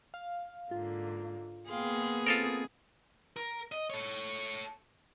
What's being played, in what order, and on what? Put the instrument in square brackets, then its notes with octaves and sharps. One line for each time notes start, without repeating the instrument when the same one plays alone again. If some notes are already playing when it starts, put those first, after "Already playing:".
[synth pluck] F5
[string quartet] G#2 D3 A#3 [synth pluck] F4
[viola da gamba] A#3 B3 G#4 [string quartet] F5 G5 C6
[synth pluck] C4 [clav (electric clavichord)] F4 A4 A#4 [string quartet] D#6
[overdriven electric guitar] A#4
D#5
A4 C#5